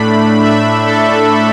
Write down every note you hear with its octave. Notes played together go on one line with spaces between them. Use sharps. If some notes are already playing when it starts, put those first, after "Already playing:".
Already playing: A2 A3 D4 B5
E5
A4